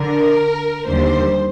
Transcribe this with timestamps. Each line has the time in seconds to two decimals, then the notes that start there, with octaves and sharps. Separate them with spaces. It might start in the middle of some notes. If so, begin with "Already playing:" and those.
Already playing: D3 A#4
0.88 D#2 D3 G3 C5